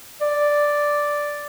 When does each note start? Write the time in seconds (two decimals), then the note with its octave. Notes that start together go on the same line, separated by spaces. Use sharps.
0.21 D5